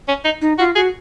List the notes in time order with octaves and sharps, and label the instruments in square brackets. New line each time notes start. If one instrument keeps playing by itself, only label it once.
[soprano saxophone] C#4
D#4
[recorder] D#4
[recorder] F4 [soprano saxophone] F#4
[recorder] F#4 [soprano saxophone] G#4